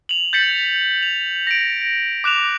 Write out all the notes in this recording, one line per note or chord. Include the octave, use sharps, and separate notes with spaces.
F7 F#7
G6 A6 B6 C#7 F#7
F7
A#6 D7
D6 F#6 E7 F7